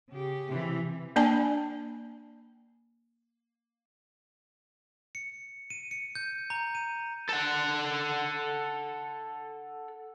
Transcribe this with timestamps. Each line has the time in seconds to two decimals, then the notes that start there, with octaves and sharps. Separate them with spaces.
0.10 C#3 G4
0.49 C3 E3
1.16 A#3 D4 D5 G#5 A5
5.15 C#7
5.70 D#7
5.91 C#7
6.15 G6
6.50 A#5
6.75 D#7
7.29 A4 F#5